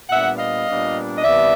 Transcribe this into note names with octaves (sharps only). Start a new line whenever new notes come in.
A#2 G3 B3 D4 E5 F#5
D#5 F5
A#2 G3 B3 D4
D#5
C3 E3 G3 B3 D4 D5 E5